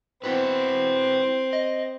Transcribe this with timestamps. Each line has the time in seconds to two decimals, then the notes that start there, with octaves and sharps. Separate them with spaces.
0.24 C4 E4 F#4 B4
1.53 D#5